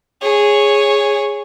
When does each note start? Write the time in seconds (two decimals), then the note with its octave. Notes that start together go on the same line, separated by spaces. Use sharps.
0.22 G#4 C#5